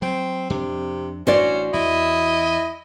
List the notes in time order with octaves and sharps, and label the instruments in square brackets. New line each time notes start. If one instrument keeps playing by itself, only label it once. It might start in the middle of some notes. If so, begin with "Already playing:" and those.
[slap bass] F#3 [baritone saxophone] C4
[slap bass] F2 D4 [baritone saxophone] C3
[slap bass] A1 D4 [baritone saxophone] C#4 [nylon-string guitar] F#4 C5 D5
[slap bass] E2 [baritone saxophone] E4 [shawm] D#5